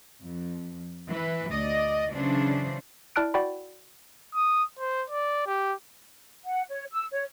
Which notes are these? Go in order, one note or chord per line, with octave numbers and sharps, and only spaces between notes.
F2
E3 B4
D2 D5 D#5
C#3 E3 F#3 C#4 D4 C5
E4 D5 A5 F6 F#6 D7
F#4 D5 F#5 G5 B5
D#6
C5
D5
G4
F#5
C#5
E6
C#5